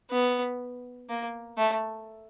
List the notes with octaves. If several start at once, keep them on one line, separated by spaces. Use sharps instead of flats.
B3
A#3
A3